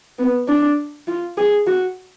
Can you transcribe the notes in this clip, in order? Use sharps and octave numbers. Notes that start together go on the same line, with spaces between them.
B3
D4
F4
G#4
F#4